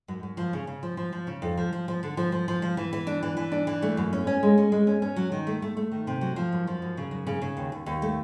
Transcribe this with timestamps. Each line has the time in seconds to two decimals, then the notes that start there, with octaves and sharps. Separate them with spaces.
0.08 F#2
0.23 F#2
0.37 F3
0.53 C#3
0.67 C#3
0.83 F3
0.97 F3
1.12 F3
1.27 C#3
1.42 F2
1.57 F3
1.73 F3
1.88 F3
2.03 D3
2.17 F3
2.32 F3
2.48 F3
2.62 F3
2.77 E3
2.93 E3
3.07 D4
3.23 E3
3.37 E3
3.52 D4
3.67 E3
3.82 A3
3.97 F#2
4.13 C#4
4.27 C#4
4.43 G#3
4.58 C#4
4.72 G#3
4.87 C#4
5.02 C#4
5.16 F#3
5.32 D#3
5.47 A3
5.62 A3
5.77 A3
5.92 D#3
6.07 C3
6.21 F#3
6.36 F3
6.52 F#2
6.67 F3
6.82 F#2
6.97 C#3
7.11 F#2
7.27 C#3
7.42 C#3
7.57 D#2
7.72 D#2
7.86 D#2
8.02 A3